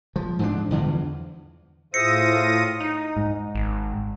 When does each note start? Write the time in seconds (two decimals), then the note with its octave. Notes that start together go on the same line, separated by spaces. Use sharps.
0.16 F3
0.39 G#2 F3 D4
0.71 E2 D3 E3 F3
1.94 A2 F4 G#4 C5 E5 D#6 A#6 C#7
2.80 D#4
3.17 G#2
3.55 G#1